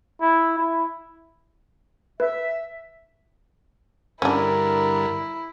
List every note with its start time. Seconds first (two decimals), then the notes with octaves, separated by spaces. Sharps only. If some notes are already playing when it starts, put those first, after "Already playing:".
0.21 E4
0.58 E4
2.20 B4 E5
4.22 G2 D3 C#4 D4 E4 A#4